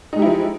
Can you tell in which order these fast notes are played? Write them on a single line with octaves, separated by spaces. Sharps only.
D#4 G#3 G4 E4 F3